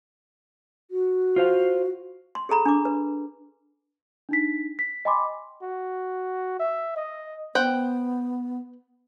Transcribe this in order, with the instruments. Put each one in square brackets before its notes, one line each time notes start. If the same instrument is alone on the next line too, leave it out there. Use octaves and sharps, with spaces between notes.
[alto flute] F#4
[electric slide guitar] F4 C5 F5
[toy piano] C6
G#4 A4 A#5 B5
D4 D6
B4
[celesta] D4 D#4 B6
B6
D#5 G5 G#5 B5 C6 D6
[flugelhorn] F#4
E5
D#5
[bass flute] B3 [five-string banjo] C5 F#5 G5